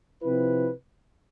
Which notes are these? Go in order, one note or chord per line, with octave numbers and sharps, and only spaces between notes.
C3 F3 C4 E4 B4